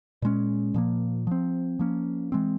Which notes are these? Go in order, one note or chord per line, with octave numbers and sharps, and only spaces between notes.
A#2 G#3 C#4
A#2 F3 A#3
F3 C4
F3 A#3 C#4
E3 G#3 C4